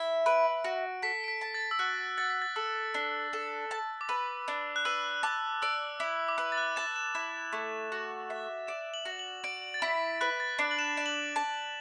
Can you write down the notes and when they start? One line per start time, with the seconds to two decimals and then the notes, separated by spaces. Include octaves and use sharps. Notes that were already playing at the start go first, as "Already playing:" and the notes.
Already playing: E4 E5
0.26 B4 D7
0.64 F#4
1.02 A4 B6
1.24 D7
1.28 B6
1.41 A5
1.54 A6
1.71 E6
1.79 F#4 F#6
2.17 F#5 A6
2.30 B6
2.42 A6
2.56 A4 E6
2.94 D4
3.33 A4
3.71 A5
4.01 D6
4.08 B4 E6
4.48 D4
4.76 F#6
4.85 B4 E6
5.23 A5 D6
5.62 D5 E6
6.00 E4 D6
6.29 D6
6.38 B4 E6
6.52 A6
6.57 F#6
6.76 A5 E7
6.96 E7
7.15 E4 E7
7.52 A3
7.92 F#4
8.30 E5
8.67 D5 E7
8.94 F#7
9.05 F#4
9.19 F#7
9.44 D5 D7
9.74 A6
9.82 E4 B6
10.21 B4 F#6
10.40 A6
10.59 D4 D7
10.71 F#7
10.79 E7
10.97 D5 E7
11.06 F#7
11.16 E7
11.36 A5